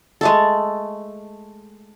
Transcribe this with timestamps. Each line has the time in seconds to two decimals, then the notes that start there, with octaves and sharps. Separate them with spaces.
0.21 G#3 A3 A4